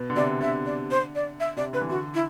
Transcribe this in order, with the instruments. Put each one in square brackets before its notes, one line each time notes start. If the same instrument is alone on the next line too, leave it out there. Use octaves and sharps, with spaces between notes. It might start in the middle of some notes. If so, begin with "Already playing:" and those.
Already playing: [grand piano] B2
D3
[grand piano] C3 [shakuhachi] D5
[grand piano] D3 [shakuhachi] E5
[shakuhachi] D5
C5
D5
E5
[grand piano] C3 [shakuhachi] D5
[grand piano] D3 [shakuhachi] B4
[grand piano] E3
[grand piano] D3 [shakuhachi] F#4
[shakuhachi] E4